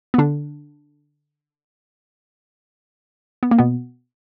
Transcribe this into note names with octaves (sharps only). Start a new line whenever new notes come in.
B3
D3 D4
B3
A#3
B2 B3